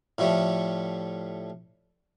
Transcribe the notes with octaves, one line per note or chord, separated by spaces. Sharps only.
A2 F3 G3 A3